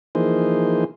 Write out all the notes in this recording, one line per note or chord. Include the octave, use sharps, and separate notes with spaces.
E3 F3 A#3 D#4 G#4 C5